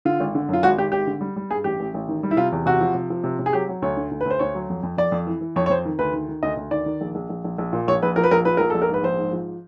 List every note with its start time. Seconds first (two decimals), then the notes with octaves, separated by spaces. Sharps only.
0.05 D3 F4
0.20 G#1
0.35 D3
0.49 F#2 F4
0.63 G#1 F#4
0.78 G#1 G4
0.92 G#1 G4
1.07 D3
1.21 G3
1.36 G3
1.51 G2 G#4
1.64 A1 G4
1.80 A1
1.94 A1
2.08 D#3
2.23 G3
2.31 E4
2.37 C3 F4
2.52 E2
2.66 C3 F#4
2.81 F3
2.95 C3
3.10 F3
3.24 C3
3.39 C3
3.46 G#4
3.53 F#3 G4
3.68 F#3
3.82 D2 C#5
3.97 D3
4.11 D2
4.21 B4
4.26 D2 C5
4.39 D2 C#5
4.55 F#3
4.70 F2
4.83 F2
4.98 F2 D5
5.12 F2
5.27 E3
5.41 E3
5.56 F2 C#5
5.66 C#5
5.70 F2 C5
5.85 D#3
5.99 D2 B4
6.13 D#3
6.29 D#3
6.43 D2 D#5
6.57 D2
6.71 D#3 D5
6.86 D#3
7.01 A#1
7.15 A#1
7.30 A#1
7.44 A#1
7.58 A#1
7.73 A#2
7.88 A#1 C#5
8.02 A#1 B4
8.16 F3 A#4
8.24 B4
8.31 A#1 A#4
8.45 F3 B4
8.57 A#1 A#4
8.70 A#1 A4
8.82 A#4
8.89 G#2 B4
9.03 A#1 C5
9.19 G#2
9.33 F3